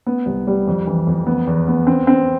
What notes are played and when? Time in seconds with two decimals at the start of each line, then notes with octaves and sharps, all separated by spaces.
0.06 B3
0.26 C2
0.47 G3
0.67 F2
0.87 E3
1.07 F2
1.27 B3
1.47 E2
1.68 B3
1.87 C4
2.07 C4